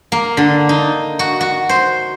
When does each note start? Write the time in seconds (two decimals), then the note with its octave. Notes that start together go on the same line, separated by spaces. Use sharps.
0.12 A#3
0.37 D3
0.69 D#4
1.19 F#4
1.41 F#4
1.69 C5